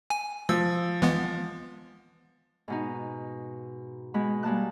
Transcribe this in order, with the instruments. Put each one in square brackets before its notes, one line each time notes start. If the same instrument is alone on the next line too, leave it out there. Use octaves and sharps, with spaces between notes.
[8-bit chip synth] G#5
[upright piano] F3 [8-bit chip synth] E6
[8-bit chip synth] E3 G#3 B3
[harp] G#2 B2 D#4
B2 G#3 B5
G3 G#3 A#3 A5 F#6